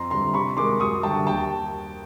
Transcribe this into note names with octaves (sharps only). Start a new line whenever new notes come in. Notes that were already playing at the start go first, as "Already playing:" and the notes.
Already playing: F2 A#5 C6
D3 G3 A#5 C6
C3 B5 C#6
D#3 G#3 C6 D6
F#2 C#6 D#6
D3 G3 G5 A5
D#2 G5 A5